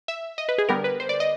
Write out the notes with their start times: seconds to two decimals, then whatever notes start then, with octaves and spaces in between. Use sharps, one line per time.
0.08 E5
0.38 D#5
0.49 B4
0.58 G#4
0.69 D3 G3 B3 A#4
0.84 B4
1.00 C5
1.09 D5
1.20 D#5